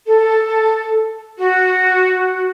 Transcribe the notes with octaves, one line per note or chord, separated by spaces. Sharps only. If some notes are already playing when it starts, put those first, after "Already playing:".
A4
F#4